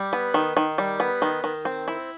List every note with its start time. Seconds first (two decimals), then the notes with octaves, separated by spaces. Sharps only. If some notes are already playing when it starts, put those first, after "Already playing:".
Already playing: G3
0.13 B3
0.34 D#3
0.57 D#3
0.78 G3
1.00 B3
1.22 D#3
1.44 D#3
1.65 C4
1.88 E4